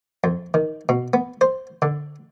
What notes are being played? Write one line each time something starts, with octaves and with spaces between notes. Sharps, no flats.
F2
D#3
B2
B3
C5
D3